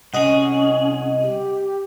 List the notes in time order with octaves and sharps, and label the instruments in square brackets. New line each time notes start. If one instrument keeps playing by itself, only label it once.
[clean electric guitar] C2 G#4 [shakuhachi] C#4 [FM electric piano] D#5 F#5
[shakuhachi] G4